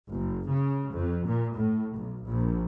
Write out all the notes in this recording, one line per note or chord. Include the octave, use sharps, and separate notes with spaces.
F#1
C#3
F2
A#2
A2
B1
A#1